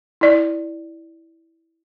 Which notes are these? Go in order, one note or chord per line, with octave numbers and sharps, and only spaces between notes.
E4 D5